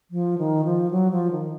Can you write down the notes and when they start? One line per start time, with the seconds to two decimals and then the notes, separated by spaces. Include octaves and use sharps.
0.11 F3
0.38 D#3
0.65 F3
0.91 F#3
1.11 F3
1.31 D#3